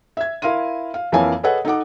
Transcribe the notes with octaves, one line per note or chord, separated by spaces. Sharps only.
E5 G#6
E4 A#4 F5 C6 D#7
F5
F2 E3 A#3 C#5 F5 G#5
G#4 A4 B4 C#5 D#5 F#5
D#4 A4 F#5 D6